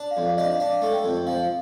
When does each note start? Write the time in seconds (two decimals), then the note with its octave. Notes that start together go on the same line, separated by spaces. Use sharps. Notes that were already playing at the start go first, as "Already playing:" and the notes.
Already playing: D4
0.11 F5
0.17 F2
0.27 F5
0.37 D4 D#5
0.44 F5
0.60 D4 F5
0.82 A3
0.93 G5
1.04 F2
1.27 F3 F5